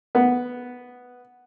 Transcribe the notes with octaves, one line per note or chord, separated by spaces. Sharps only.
B3